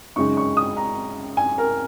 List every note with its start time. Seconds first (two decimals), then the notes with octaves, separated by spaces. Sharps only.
0.16 F#2 C#3 G#3 D#4 C#6
0.37 C#6
0.57 D#6
0.77 A#5
1.37 G#5
1.58 A#4